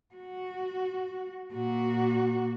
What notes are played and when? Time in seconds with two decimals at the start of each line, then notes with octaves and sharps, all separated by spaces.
0.15 F#4
1.54 A#2 F#4